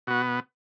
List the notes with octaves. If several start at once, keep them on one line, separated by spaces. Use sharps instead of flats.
B2 B3 F#4